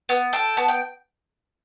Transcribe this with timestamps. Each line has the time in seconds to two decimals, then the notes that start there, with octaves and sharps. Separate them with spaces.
0.09 B3
0.33 A4 G5
0.57 B3 A5
0.68 G5